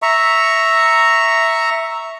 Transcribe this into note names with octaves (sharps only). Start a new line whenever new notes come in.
E5 A#5 C#6